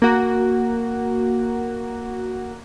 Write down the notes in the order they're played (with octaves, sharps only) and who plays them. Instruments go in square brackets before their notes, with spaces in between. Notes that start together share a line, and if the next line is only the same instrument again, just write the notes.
[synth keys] A#3 F#4